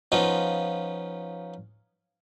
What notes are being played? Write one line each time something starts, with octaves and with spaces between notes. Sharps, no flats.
F3 B3 C#4 D#4 F4